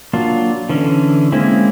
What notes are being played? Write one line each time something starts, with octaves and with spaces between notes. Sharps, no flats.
F#3 A#3 D4 F4
D3 E3 C#4
G#3 A#3 C4 C#4 E4